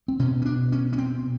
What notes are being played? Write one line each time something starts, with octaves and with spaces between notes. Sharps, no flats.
C4
B2 C#4
C#4
D4
C#4
C#4
C4